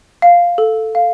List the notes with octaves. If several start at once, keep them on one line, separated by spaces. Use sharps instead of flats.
F5
A4
F5